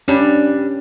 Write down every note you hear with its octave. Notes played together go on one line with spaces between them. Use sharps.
G2 G3 C#4 D4 G4